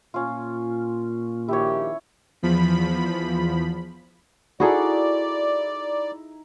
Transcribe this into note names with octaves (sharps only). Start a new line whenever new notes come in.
A#2 C#4 F4
A#1 D#3 E4 G4 C#5
E2 F3 B5
D#4 E4 F#4 G#4 A4 D5 B5